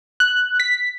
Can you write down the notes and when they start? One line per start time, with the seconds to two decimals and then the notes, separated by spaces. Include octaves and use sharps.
0.20 F#6
0.60 B6